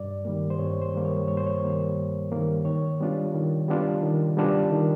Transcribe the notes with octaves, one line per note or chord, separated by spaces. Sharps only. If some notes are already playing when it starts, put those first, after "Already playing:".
Already playing: G2 D5
D#3 G3 A#3
C5
G2 C#5
C5
D#3 G3 A#3
C#5
G2 C#5
C5
C#5
D#3 G3 A#3
G2
D#3 G3 A#3
D#3 C#5
G3 B3 D4 F4
D#3
G3 B3 D4 F4
D#3
G3 B3 D4 F4
D#3